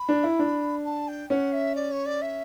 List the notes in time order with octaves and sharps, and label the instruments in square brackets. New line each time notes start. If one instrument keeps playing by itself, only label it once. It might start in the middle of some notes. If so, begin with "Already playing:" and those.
Already playing: [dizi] B5
[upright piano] D4
E4
D4
[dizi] A5
G5
[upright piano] C#4 [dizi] F#5
[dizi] E5
D5
C#5
D5
E5